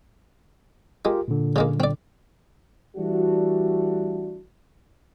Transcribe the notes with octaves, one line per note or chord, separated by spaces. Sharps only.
G#3 F4 G4 A#4
A#2 D3
C#3 G#3 A#3
C4 D5
E3 G3 A3 D4 F#4